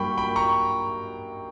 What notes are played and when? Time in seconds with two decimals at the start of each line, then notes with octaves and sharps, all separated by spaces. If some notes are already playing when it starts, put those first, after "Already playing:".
Already playing: G2 F#3 A#3 G5 B5 C#6
0.18 G5 B5
0.36 A#5 C#6